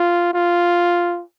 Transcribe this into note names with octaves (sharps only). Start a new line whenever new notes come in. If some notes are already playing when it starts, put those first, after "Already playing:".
Already playing: F4
F4